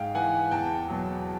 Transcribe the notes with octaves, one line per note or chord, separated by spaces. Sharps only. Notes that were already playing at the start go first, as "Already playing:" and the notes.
Already playing: G#2 F5 G5
E3 F#5 G#5
E2 G5 A5
B2 F#3